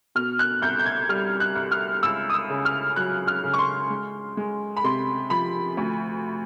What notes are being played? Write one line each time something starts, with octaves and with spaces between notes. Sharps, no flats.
B2 F6
F#6
C2 G6
G6
G#6
G3 F6
F#6
C2
F6
C#2 E6
D#6
E6
C#3
F6
F#3 F#6
F6
C#3
C#6
C6
G#3
G#3
B5
C3 C6
F3 B5
D2